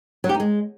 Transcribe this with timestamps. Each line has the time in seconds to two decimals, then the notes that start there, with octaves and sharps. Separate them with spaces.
0.24 F#3
0.29 G4
0.34 D#4
0.40 G#3